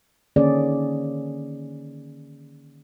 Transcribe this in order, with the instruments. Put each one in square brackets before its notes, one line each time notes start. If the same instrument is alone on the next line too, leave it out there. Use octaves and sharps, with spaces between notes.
[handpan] D3 D#3 A#3 C#4 G#4 D5